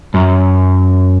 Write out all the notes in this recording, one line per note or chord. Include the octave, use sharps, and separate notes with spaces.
F#2